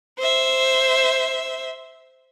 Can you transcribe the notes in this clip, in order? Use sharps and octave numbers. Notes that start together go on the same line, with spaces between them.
C5 E5